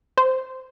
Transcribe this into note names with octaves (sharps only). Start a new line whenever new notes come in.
C5